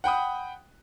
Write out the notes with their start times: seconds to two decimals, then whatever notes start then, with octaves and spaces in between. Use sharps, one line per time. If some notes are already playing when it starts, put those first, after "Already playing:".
0.04 F#5 G5 B5 D#6